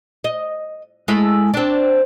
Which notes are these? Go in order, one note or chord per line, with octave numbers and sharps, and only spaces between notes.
D#5
G#3 A3 E4
C4 D4